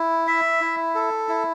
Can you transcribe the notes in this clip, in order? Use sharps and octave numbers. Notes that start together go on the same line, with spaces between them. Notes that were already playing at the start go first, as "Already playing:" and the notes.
Already playing: E4
E5
E4
A4
E4